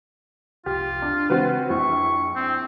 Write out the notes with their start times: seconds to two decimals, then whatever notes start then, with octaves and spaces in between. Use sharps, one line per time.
0.66 F1 C2 F4 G4
1.02 D4
1.30 C#3 E3 G#3 C4 F#4 B4
1.70 A#1 F2 E4 C#6
2.36 C4